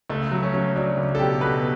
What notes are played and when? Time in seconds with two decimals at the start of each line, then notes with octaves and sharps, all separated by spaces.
0.10 C#2 A3
0.31 F#3
0.43 C#4
0.53 F#3
0.75 F#3 D4
0.97 C#2
1.15 A4
1.19 B2 G4
1.41 B2 B4